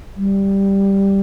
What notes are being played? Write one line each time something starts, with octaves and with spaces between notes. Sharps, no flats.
G3